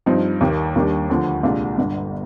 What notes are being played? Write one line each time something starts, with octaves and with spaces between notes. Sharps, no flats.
G2 F3 C4 D#4
D#2 D#3 A#3
D#2 D#3 G3 D4
D2 D3 F3
C2 A#2 G#3 D4 F4
G1 G2 D3